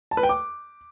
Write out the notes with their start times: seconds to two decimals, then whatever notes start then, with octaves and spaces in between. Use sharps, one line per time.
0.11 A5
0.17 B4
0.23 G5
0.29 D6